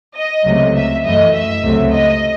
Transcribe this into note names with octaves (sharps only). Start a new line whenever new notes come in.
D#5
C#2 C3 F#3 A3
E5
F#2 E3 A3 D#5
E5
C#2 C3 F#3 A3
D#5